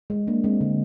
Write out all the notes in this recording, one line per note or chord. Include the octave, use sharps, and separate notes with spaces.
G#3
A#3 D4
G#3 C4
D3